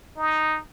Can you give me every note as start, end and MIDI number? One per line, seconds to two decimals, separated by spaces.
0.17 0.59 63